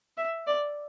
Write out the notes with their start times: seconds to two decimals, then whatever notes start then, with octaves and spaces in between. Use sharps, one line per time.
0.18 E5
0.47 D5